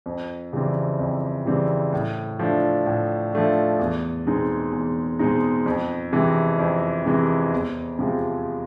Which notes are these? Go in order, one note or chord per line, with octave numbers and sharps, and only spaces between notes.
F2
C#3 E3 G3 C4
F2
C#3 E3 G3 C4
A2
F3 A3 D4
A2
F3 A3 D4
E2
B2 G#3 C4 D#4
E2
B2 G#3 C4 D#4
F2
C3 E3 G#3
F2
C3 E3 G#3
E2
C3 F3 G#3